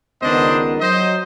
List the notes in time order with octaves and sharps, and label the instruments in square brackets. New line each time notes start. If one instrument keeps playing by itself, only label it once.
[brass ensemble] C#2 D#3 B3 [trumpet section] D4 C5 D#5
[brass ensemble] F#3 [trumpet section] C5 D#5